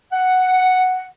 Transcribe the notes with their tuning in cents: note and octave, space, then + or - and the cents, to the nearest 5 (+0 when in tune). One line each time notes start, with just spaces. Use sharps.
F#5 +0